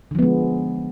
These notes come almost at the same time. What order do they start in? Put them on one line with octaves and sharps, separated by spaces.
D3 F3 B3 G#3